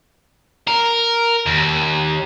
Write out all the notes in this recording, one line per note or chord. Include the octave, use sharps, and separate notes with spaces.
A#4
D#2